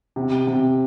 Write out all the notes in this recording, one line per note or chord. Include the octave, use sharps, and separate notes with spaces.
C3
C3